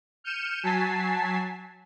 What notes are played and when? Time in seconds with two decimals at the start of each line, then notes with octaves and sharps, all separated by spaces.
0.24 F6 G6 C#7 D#7 E7
0.63 F#3 G#5 A5 B6 C7